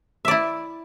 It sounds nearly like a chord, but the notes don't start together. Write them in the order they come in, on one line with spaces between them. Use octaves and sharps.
E5 D5 E4